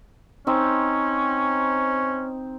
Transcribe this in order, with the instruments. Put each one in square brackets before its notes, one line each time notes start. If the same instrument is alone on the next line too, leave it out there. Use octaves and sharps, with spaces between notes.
[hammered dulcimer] C4 D#4 [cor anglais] C#4